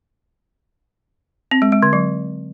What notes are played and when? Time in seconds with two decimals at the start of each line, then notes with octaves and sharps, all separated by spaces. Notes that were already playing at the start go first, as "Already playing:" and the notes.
1.51 C4
1.62 G#3
1.72 G#3
1.83 D3
1.93 F#3